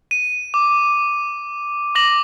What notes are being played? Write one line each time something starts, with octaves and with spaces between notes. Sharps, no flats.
D#7
D6
D6 A#6 F#7